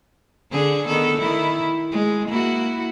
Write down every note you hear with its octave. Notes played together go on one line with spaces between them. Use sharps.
D3 D4 G#4
D#3 B3 A4
D#3 E4
G#3
A#3 E4 F#4